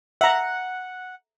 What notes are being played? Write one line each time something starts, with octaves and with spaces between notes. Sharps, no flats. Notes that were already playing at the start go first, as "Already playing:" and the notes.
E5 F#5 A#5